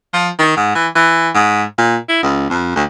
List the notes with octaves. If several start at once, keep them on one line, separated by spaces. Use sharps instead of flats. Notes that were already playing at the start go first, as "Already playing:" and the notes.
F3
D#3
G#2
E3
E3
G#2
A#2
E4
C#2
F2
D2